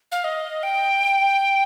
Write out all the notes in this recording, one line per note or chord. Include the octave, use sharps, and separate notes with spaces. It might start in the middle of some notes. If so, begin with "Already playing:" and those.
F5
D#5
G5